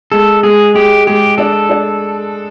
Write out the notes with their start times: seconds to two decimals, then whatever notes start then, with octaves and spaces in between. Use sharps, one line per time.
0.12 G#3 A4
0.43 G#3 G#4
0.74 G#3 G4
1.07 G#3 G4
1.38 D4 A4
1.69 D4